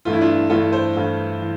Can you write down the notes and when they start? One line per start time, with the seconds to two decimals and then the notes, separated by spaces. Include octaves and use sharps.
0.05 G2 E3 A3 F4
0.13 E4
0.21 D4 F4
0.50 G2 E3 A3 F4 A4
0.72 A4 C5
0.95 G2 E3 A3
1.42 E3